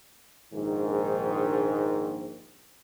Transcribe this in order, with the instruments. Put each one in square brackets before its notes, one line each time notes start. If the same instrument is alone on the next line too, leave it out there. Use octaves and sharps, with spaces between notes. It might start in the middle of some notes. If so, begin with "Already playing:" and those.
[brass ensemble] A#1 G#2 D#3